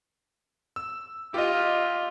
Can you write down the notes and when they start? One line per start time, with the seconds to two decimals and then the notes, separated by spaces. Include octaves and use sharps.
0.76 E6
1.34 F4 G4 D#5